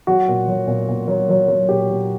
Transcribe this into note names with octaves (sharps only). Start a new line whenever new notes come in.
F#3 F#4
A#2
F#3
A#2
A#2
F#3
F#3
F#3
A#2 G4
A#2